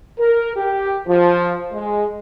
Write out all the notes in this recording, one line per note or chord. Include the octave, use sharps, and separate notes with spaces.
A#4
G4
F3
G#3